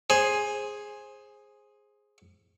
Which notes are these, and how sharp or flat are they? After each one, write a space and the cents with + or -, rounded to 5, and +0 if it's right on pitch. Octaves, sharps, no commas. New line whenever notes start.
G#4 +0 C5 +20